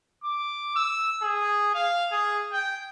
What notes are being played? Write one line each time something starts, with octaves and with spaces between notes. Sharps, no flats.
D6
E6
G#4
F5
G#4
G5